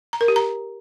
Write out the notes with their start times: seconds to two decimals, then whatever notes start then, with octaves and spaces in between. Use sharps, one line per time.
0.13 A#5
0.21 A#4
0.28 G4
0.36 A#5